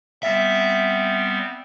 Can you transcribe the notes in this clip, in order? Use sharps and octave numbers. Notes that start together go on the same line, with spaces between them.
G3 B3 C4 E5